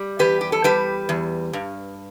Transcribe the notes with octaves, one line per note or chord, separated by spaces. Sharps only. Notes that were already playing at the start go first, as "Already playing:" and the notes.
Already playing: G3
E2 G4 B4
G4
A4
G3 G4 B4
E2
G2